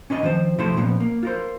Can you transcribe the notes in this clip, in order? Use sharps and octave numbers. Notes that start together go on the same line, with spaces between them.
C#4 D4 B4 D#5
D#3 F3 C4 C5
C3 F3 A3 E4 C5 C6
A#2 F3 B3 C#4
A#3
F4 A#4 C5